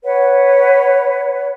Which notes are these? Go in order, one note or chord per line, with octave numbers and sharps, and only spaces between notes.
B4 C#5 F#5